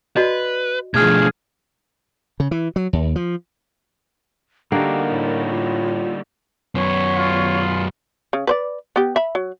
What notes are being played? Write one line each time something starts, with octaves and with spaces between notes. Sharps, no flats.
F#4 B4 D5 D#5
B2 D3 F3 A3 G#4 F6 G#6
C#3
E3
F#3
D#2
F3
D3 G3 A#3 D#4 F#4 G4 A#4
A2
F4
F#2 B3 C#5
F4
C#3
B4 C5 D5
B3 G4
E5 B5
F#3